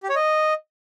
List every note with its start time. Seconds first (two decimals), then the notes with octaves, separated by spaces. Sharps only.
0.03 G4
0.09 C#5
0.16 D#5